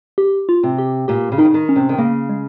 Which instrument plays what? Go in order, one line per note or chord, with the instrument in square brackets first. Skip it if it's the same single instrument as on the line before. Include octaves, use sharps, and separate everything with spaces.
[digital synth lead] G4
F4
[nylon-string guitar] C3
[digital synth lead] G4
[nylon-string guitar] A#2 [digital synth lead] G4
[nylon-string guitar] C#3
[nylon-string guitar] D#3 [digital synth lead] D#4
[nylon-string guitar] C#3
D#3
[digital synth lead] C#4
[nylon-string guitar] C3
D#3
[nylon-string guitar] C#3 [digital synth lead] A#3
[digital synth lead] G#3